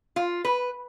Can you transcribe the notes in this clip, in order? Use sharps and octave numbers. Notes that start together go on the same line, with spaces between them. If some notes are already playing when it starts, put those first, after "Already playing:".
F4
B4